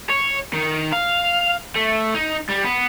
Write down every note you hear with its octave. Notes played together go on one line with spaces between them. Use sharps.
C#5
D#3
F5
A3
D#4
G3
B3